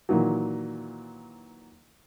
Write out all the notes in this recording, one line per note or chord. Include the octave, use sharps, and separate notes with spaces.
A#2 D#3 E3 F#3